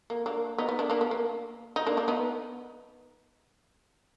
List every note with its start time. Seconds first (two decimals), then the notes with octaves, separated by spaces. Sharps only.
0.10 A#3
0.26 A#3 D4
0.58 B3 D#4
0.69 B3
0.79 A#3 D4
0.90 A#3 D4
1.01 B3
1.11 A#3
1.76 D#4
1.87 A#3 D4
1.97 A#3 D4
2.08 B3 D#4